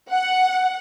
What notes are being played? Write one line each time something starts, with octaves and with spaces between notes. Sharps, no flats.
F#5